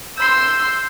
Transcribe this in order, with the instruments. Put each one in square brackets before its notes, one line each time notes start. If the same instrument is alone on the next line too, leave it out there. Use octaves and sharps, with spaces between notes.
[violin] C6 E6 [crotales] G6 C7